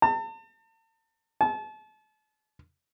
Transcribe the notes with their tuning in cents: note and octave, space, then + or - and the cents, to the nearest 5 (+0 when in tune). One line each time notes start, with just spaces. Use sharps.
A5 +40
A5 -35